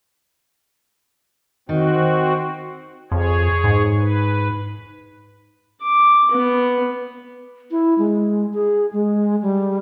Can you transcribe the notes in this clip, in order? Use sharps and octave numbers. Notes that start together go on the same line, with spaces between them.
D#3 C4 F#4
F2 G#4 C#5
G#2
B4
D6
B3
E4
G#3
G#4
G#3
G3